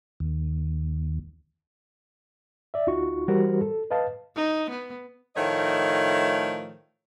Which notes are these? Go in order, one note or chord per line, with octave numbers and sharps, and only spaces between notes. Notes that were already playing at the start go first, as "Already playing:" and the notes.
D#2
D5 E5
D2 D#4 F4 F#4 C#6
E3 G3 F#4 G4 A#4 C5
A4
B4 D#5 F5 A5
D#4
B3
A2 D#3 F3 A3 C#5 D#5